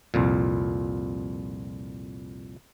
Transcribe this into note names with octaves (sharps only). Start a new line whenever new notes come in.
C2 F2 A#2